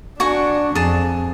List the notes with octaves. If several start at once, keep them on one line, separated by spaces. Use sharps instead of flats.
D4 F#4 G#5 C#6
F2 G#4 A5